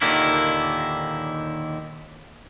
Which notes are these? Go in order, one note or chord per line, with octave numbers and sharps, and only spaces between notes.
D#2 A#2 D3 D#3 A#3 E4